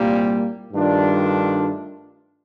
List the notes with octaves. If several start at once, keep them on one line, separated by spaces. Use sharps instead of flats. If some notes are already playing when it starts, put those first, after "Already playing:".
Already playing: C2 A#2 G3 A#3
G2 D#3 A3 D4 F4